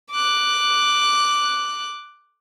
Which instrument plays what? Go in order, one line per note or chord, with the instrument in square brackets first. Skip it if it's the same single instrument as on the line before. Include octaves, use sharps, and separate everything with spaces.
[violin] D6 F#6